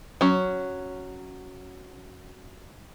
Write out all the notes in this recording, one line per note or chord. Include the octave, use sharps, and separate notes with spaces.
F#3 C#4